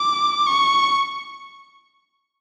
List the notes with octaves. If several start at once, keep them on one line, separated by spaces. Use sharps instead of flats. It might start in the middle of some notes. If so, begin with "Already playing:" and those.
Already playing: D6
C#6